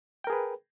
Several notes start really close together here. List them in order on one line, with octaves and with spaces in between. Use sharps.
G5 A#4 G#4 B4